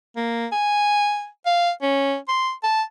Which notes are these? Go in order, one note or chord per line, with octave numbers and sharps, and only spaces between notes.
A#3
G#5
F5
C#4
C6
A5